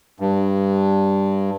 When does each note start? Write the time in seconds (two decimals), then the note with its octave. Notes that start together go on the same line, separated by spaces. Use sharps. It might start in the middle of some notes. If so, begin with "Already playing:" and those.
0.20 G2